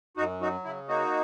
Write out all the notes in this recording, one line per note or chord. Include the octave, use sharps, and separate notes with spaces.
F#2 D#4 F#4
F#3 D#4 F#4
C#3 E4
A#3 D#4 F#4